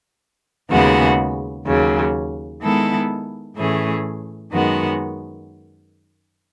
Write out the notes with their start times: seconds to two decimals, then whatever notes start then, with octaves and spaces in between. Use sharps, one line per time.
0.70 D#2 C#3 G#3 B3 F#4
1.66 D#2 C#3 F#3
2.61 D#3 G#3 B3 E4 A4
3.56 A2 E3 A3 C#4 G#4
4.51 F#2 D#3 G#3 B3 F#4